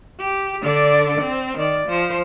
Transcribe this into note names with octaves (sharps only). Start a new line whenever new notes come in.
G4
D3 D5
C4
D#3 D5
F3 C5